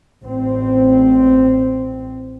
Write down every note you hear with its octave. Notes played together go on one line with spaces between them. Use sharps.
A1 C4